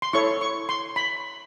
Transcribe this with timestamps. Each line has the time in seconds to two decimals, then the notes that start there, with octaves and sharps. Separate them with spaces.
0.02 C6
0.13 E4 A4 C#5 C#6
0.41 C#6
0.69 C6
0.96 B5